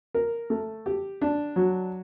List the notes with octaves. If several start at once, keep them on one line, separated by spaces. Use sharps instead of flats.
A#4
A3
G4
D4
F#3